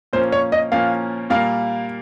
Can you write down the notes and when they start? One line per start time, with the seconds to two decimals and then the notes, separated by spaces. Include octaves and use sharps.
0.13 A#2 F3 A#3 C#4 C5
0.32 C#5
0.52 D#5
0.72 A#2 F3 A#3 C#4 F5
1.30 A#2 G3 A#3 F5